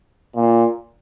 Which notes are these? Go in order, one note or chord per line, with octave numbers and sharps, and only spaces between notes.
A#2